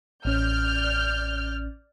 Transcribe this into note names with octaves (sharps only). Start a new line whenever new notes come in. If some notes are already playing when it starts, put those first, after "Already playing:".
A1 C#4 D5 F6 G6